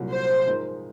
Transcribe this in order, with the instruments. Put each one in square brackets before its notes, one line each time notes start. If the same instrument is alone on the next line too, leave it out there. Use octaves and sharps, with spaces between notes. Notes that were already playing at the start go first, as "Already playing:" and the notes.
Already playing: [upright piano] C2 A#2 F#3
[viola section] C5
[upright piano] G#2 F3 G#3 D#4 A#4